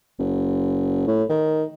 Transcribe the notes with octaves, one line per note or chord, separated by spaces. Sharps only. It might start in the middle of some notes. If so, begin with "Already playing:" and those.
F#1
A2
D#3